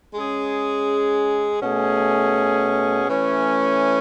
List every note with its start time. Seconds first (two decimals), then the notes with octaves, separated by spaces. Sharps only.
0.14 G#3 C#4 G#4
1.62 B2 A3 C#4 G#4
3.09 E3 A3 C#4